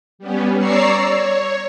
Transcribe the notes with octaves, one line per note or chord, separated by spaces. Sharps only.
G3 B3 C#4
C#5 D5 A#5 C#6 E6 C7
C#5